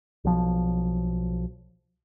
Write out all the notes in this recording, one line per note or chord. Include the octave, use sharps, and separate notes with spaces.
B1 F3